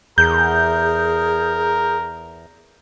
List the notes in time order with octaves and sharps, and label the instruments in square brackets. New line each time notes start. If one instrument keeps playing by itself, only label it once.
[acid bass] E2 [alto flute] G#4 [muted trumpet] A#4 [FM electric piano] G6